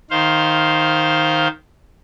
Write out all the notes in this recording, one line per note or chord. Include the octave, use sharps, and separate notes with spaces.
D#3 C5 F5